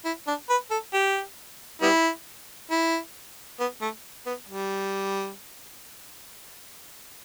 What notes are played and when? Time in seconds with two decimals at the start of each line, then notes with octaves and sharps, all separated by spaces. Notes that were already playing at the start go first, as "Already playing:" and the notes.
0.05 E4
0.27 D4
0.50 B4
0.71 A4
0.93 G4
1.82 G3 B3 E4
2.71 E4
3.60 B3
3.81 A3
4.26 B3
4.49 G3